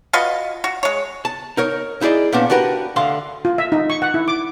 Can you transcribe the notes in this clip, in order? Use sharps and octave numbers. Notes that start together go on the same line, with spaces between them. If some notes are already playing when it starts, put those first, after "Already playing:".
F4 F#4 B4 D#5
F#4
G#3 C#5
A5
D#4 A#4 C#5
D#4 E4 G#4 D5 D#5
A#2 A#3 B3 C#4 D4
D4 F#4 G4 A#4 B4
D2 D3 F5 C6
F4
E5
D#4
C#6
F#5
E4
D6